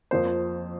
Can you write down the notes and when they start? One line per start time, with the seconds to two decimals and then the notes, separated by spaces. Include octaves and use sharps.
0.11 F2 F3 A#3 C5
0.26 C5